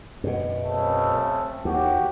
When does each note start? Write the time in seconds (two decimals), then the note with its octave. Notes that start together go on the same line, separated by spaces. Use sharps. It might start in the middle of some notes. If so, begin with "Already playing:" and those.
0.24 F#2 B2
0.62 C#3 A3 C4
1.65 D#2 F#4 G4